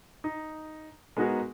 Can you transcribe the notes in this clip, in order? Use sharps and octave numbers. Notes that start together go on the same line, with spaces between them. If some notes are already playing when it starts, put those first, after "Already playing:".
D#4
G#3 B3 D#4 F#4 G#4 A#4